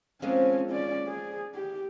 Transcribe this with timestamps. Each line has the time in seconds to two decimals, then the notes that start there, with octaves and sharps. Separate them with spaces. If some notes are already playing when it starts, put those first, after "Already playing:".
0.22 F3 G#3 A#3 C4 C#4
0.71 C#4 D5
1.07 G#4
1.55 G4